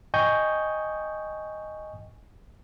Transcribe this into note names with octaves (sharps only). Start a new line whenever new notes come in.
D#5 G5 G#5 C#6 D#6 G6